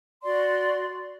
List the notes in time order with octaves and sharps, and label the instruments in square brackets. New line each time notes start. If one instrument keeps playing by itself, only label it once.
[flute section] F#4 D5 C6